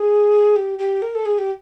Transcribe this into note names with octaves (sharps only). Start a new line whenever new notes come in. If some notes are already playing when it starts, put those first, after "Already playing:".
Already playing: G#4
G4
G4
A#4
A4
G#4
G4